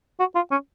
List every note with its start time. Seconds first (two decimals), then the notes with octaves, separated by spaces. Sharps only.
0.20 F#4
0.35 F4
0.51 C#4